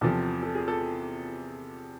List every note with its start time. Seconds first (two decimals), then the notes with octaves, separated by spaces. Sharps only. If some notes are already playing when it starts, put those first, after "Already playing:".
0.01 E2 C3 F3 A4
0.43 A4
0.55 G#4
0.68 A4